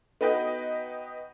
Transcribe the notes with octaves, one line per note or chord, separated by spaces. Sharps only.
B3 D#4 F#4 B4 D#5 G5